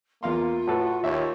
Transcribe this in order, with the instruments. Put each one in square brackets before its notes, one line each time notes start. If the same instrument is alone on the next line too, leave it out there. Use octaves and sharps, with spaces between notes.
[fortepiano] E2 F5 C6 [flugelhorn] A#3 [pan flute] F4
[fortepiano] A2 A4 B4 [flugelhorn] F#4
[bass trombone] D#2 [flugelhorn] C#5 [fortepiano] E5